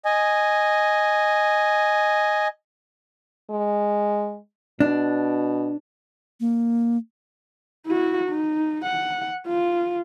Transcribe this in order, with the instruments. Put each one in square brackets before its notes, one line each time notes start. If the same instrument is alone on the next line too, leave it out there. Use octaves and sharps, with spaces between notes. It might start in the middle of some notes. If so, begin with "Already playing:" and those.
[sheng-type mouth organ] D#5 G#5
[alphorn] G#3
[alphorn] B2 [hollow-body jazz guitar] D4
[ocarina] A#3
[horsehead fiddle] E4 F#4
D#4
F#5
F4